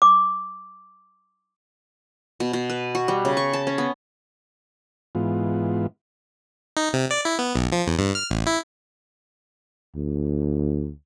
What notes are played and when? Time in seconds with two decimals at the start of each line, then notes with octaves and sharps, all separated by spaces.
0.02 D6
2.40 B2
2.53 B2
2.70 B4
2.95 F#4
3.08 G3
3.25 C#3
3.37 C#6
3.53 A5
3.67 C#4
3.78 B3
5.15 G#2 E3 B3 F4
6.77 D#4
6.93 C3
7.11 D5
7.25 E4
7.39 B3
7.56 B1
7.72 F3
7.87 E2
7.99 G2
8.15 F6
8.31 A1
8.47 E4
9.96 D2